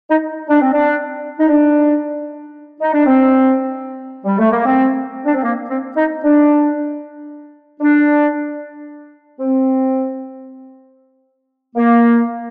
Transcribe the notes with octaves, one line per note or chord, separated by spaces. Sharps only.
D#4
D4
C4
D4
D#4
D4
D#4
D4
C4
G3
A3
A#3
C4
D4
C4
A#3
C4
D#4
D4
D4
C4
A#3